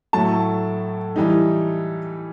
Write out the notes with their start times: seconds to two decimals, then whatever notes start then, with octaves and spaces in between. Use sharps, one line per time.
0.13 A2 F#3 A3 A5
1.16 E3 G3 D#4